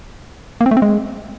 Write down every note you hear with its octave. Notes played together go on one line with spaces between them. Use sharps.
A#3
C4
A3
C4
G#3